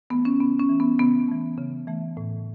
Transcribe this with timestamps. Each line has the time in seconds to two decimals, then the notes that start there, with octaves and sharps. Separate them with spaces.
0.10 E3 A3 B3
0.25 C#4
0.40 C#3 B3
0.60 C#4
0.69 E3 A3
0.80 B3
0.99 C#3 B3
1.28 E3 A3
1.58 C#3
1.87 E3 A3
2.17 A2